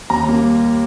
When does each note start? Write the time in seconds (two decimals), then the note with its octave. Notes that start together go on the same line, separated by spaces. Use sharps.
0.10 D#2 A#5
0.28 G3 A#3